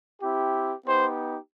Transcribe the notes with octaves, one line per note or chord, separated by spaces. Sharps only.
C4 E4 G4
B3 D#4 G4 C5